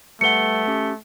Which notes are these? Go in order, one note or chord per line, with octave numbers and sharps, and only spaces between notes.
G3 A3 B4 F#5 C#7 G7
C#4 G4